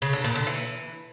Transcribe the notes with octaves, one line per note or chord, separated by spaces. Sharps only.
C#3
D3
A#2
D3
E3